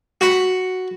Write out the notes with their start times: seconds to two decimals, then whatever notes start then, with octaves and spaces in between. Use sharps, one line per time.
0.21 F#4 F#5 B5